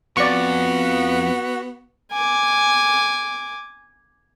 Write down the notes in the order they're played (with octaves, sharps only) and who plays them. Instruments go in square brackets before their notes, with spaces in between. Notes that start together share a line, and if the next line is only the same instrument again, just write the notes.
[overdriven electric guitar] F2 [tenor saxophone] B3 [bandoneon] F#4 [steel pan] D5 C#6
[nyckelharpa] G#5 D6